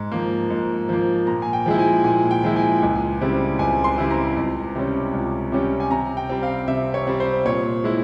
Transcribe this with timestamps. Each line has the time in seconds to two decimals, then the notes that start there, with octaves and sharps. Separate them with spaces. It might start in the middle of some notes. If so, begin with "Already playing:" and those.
Already playing: G#2
0.12 F3 A#3
0.50 G#2
0.89 F3 A#3
1.27 A#2 A#5
1.42 G#5
1.53 G5
1.66 F3 G#3 E4
1.79 G#5
2.04 A#2 G#5
2.31 G5
2.44 F3 G#3 E4
2.56 G#5
2.82 C#2
3.21 C#3 G3 C4 E4
3.59 C#2 G#5
3.84 C6
3.98 C#3 G3 C4 E4
4.10 A#5
4.37 C#2
4.75 C3 G3 C#4
5.13 C#2
5.52 C3 G3 C#4
5.80 G#5
5.91 C3 A#5
6.17 G5
6.29 G3 C4
6.43 F5
6.68 C3 E5
6.94 C#5
7.07 G3 C4
7.20 C5
7.45 A#2 C#5
7.84 G#3 E4